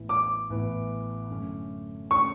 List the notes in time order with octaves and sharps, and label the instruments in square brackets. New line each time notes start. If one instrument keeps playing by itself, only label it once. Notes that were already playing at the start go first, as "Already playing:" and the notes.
Already playing: [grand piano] A1 A2 E3 B3
[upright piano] D6
[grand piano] A1 A2 E3 B3
F#2 D3 A3 C#4
[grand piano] D3 A3 C#4 [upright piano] C#6